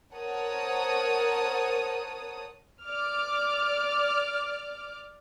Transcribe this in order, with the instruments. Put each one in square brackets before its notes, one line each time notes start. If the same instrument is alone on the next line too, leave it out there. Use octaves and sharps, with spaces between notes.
[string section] A#4 C5 C#5 F#5 A5 D#6
[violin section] D5 D6 F6